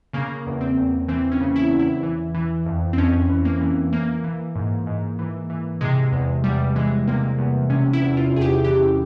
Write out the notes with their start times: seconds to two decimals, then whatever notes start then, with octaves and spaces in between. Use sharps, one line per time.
0.13 C#3 A#3
0.46 E2
0.61 C4
0.77 E2
1.08 E3 C4
1.32 C#4
1.40 C#3
1.56 E4
1.71 E2
1.80 E4
2.03 E3
2.34 E3
2.66 F2
2.93 C4
2.98 F2 C#4
3.30 E3
3.45 A#3
3.61 E3
3.93 E3 A#3
4.24 E3
4.56 G#2
4.86 G#2
5.19 E3
5.50 E3
5.81 C3 G#3
6.12 E2 G#3
6.44 E2 G3
6.76 E3 G#3
7.08 C3 A#3
7.39 E2
7.70 C3 C#4
7.93 E4
8.01 E2
8.17 F4
8.33 E2 G#4
8.41 G4
8.64 E3 G4